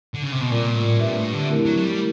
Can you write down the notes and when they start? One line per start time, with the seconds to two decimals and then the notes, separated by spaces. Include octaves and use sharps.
0.14 D3
0.23 C#3
0.32 C3
0.41 B2
0.50 A#2 G3 C4 F4 A#4 D5
0.75 A2
0.99 A#2 D4 G4 B4 E5
1.16 A2
1.33 D3
1.49 A3 C4 E4 G4 A#4
1.65 F#3
1.76 F#3
1.82 G3